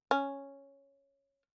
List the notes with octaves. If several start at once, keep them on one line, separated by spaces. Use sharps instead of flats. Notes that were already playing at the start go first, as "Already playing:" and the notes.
C#4